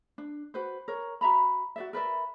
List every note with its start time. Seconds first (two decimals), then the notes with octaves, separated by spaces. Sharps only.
0.18 D4
0.54 F#4 B4 C5
0.88 A#4 C#5
1.21 F#4 E5 A#5 B5
1.76 F#4 D5 E5
1.93 A#4 B4 D5 E5